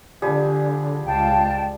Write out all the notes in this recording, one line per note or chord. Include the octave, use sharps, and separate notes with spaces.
D3 F3 G3 G#4
C#2 F5 G5 A5